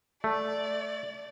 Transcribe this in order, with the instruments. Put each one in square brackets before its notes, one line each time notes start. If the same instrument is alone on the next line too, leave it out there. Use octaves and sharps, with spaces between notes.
[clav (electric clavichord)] A3 [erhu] D5